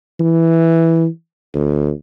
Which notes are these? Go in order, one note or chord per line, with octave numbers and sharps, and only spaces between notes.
E3
D2